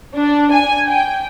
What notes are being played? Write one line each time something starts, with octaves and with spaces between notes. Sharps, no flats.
D4
G#5
G5